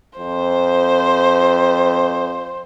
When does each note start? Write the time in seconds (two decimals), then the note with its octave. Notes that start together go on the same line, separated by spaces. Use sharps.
0.19 F2 C5